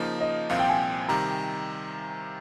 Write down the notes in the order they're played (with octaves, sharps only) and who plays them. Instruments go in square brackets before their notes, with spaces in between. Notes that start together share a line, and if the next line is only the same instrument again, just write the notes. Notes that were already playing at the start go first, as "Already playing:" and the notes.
Already playing: [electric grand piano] C#3 F3 A#3 D#4
[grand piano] D#5
[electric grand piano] C2 A#2 F3 C4 [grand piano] F5
[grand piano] G5
G#5
[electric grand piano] C3 D#3 G3 [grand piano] A#5